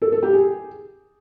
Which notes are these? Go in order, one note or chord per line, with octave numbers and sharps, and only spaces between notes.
A4
A4
G4
G#4